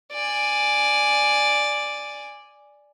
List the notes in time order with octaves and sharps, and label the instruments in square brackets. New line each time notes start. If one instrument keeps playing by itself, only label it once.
[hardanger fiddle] D5 G#5